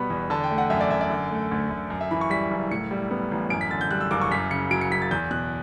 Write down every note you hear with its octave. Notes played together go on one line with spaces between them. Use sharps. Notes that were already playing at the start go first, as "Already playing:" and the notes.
Already playing: B2 G3 B3 B5 C#6
E2
D3 A5
G5
A3
F#5
F#2 E5
D5
F#2 E5
D5
D3
A3
D2
D2
F#2
E5
E3 B5
C#6
G3 B6
F#1
A2 C#7
G3
B3
A1
F#2 D7
B6
D3 A6
G6
G3 F#6
E6
F#1 D6
C#6
F#2 B6
C#3 C#7
F#3 D7
C#7
F#1 B6
A6
E2 G6
B2 F#6